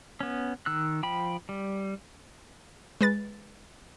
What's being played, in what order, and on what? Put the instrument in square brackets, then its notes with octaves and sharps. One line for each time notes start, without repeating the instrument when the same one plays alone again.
[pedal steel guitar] B3 C#4
D#3 E6 F#6
F3 G5 B5
G3
[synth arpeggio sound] G#3 B4 A6